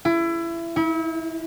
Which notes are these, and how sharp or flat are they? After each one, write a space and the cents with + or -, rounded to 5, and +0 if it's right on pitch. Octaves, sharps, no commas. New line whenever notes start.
E4 +25
E4 -35